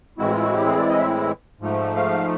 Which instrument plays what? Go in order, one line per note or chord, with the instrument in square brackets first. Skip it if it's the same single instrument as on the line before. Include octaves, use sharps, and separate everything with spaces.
[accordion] A2 E3 G#3 C4 E4 F#4
F4
F#4
G4
G#4
D5
D#5
E5
G#2 F3 A3
F5